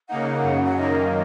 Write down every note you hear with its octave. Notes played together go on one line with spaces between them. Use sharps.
C#3 A#3 D#4 F#5
F#2 C#3 F#3
F#5
F#2 D#3 A#3 D#5